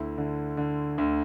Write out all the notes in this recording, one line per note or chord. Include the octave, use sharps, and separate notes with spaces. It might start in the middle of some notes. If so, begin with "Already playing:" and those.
Already playing: D2 E4
D3
D3
D2